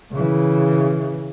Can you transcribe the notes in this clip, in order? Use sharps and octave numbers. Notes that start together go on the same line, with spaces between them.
C#3 E3